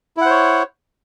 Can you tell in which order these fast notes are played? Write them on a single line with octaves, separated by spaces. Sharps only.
E4 F#5 C5 C#5